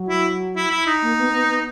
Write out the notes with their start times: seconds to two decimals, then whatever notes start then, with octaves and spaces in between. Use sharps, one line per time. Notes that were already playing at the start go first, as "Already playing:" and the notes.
Already playing: F#3
0.09 E4
0.56 E4
0.71 E4
0.87 D#4
1.02 A#3
1.18 B3
1.33 B3
1.49 B3